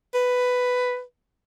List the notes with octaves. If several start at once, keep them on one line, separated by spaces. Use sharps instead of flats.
B4